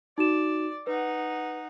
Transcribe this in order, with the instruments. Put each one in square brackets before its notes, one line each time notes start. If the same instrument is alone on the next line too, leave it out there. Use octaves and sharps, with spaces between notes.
[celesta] D#4 F#4 E7 [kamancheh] D5
[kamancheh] D#4 F#5 [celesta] B4